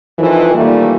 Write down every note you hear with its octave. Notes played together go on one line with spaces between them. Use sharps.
F2 D#3 E3
A#2 D#3 E3 G3 A3 A#3